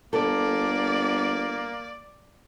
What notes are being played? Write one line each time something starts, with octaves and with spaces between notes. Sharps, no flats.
G1 A#3 A4 D5